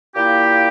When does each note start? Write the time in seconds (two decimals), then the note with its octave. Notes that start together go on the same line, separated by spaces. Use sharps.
0.13 A#2 A#3 E4 G4